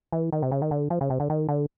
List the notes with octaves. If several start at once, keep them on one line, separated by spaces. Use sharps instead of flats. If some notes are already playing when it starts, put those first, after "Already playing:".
E3
D#3
C3
C#3
D#3
D3
F3
C#3
C3
D3
D#3
D3